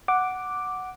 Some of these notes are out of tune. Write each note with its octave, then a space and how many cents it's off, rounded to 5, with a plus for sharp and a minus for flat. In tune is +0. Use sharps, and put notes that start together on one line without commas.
F#5 +0 D6 +0